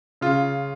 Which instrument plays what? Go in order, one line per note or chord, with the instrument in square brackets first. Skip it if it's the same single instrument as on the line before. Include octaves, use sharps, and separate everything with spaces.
[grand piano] C#3 F4